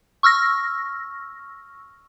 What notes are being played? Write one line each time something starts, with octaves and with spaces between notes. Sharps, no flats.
C#6 E6 F6 A#6